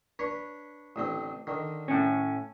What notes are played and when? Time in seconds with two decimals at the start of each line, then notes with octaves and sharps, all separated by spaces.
0.19 D4 B4 C#5
0.96 A1 D3 C4
1.47 D3 D#3
1.88 A2 C#4